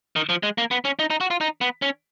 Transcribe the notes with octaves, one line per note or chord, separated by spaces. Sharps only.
D#3
F3
G#3
A#3
B3
C#4
D#4
D#4
F#4
F4
D#4
B3
C#4